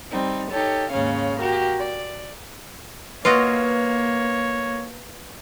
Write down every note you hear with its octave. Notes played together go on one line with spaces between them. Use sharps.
G3 C4 D#4
D#4 G4 A4 C#5
D#2 G#2 C#3 C#4 C#5 F5
F#4 G4 A#4 F5
D5
A#3 F4 F#4 B4 C#5 D#5